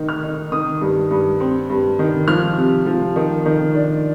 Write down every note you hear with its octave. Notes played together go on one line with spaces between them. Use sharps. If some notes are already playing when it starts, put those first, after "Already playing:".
Already playing: D#3 D#4
F6
D#4
D#3 D#6
G2
G2
C4
G2
D#3
F3 F6
C3
F3
D#3
D#3
D4